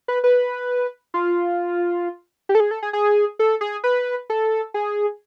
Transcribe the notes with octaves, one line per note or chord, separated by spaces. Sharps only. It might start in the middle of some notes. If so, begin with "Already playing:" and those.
B4
B4
F4
G4
A4
G#4
A4
G#4
G#4
A4
G#4
B4
A4
G#4